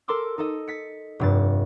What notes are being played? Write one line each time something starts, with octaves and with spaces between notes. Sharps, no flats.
A4 A#4 C6 D6 E6
D#4 A4 D#5
A6 B6 C#7
F1 G2 A6